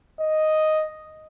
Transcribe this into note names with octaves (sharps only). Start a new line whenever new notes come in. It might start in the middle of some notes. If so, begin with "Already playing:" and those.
D#5